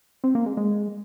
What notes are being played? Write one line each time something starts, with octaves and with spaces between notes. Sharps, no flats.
C4
A#3
G#3
G#3